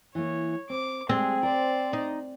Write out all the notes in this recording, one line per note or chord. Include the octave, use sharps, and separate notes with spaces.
E3 A#3 C#5
C4 D6
G3 G#3 C4 G#4
A#4 C5 D5
D#4